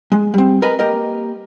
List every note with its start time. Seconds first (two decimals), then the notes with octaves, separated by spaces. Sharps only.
0.12 G#3
0.34 G3 C4
0.62 A#4 B4 D#5 G#5 A#5 B5
0.79 A#3 G4 A#4 D#5